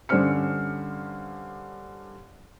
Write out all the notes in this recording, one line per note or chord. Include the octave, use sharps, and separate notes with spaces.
G2 D3 C#4 C5 F6 C#7